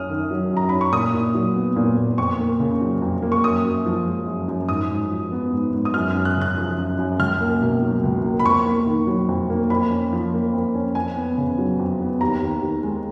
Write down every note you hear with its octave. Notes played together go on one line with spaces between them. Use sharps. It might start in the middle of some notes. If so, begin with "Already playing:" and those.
Already playing: F#2 C#4 D#6 F6
D#3
F#3
F#2
A#5
C#4 B5
C#6
A#2 D#6
A#2
F#3
B3
A#2
A#2
F2 C#6
A#3
C#3
F#3
F2
A#3
C#6
F#2 D#6
F#2
F3
G#3
F#2
F#2
G#2 D#6
G#2
F3
B3
G#2
G#2
D#6
F#2 F6
F#2 F6
F#6
C#3
F#6
F3
F#2
F#2
C#2 F6
A#3
B2
F#3
C#2
A#3
B5
F2 C#6
A#3
D#3
F#3
F2
A#3
F2 B5
C#4
F3
A#3
F2
C#4
F2 G#5
B3
C#3
F#3
F2
B3
D#2 A#5
D#2
D#3
G#3